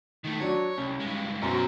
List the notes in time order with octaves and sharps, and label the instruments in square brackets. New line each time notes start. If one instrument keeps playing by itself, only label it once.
[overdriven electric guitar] D#3 A3
[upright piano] F#3 D4 [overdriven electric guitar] C#5
[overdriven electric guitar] C2 [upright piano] C#4
[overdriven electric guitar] G2 G#3
[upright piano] F#2 B2 F#3 [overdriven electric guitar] C#4 C5